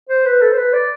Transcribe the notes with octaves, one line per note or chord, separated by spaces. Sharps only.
C5
B4
A4
C5
B4
D5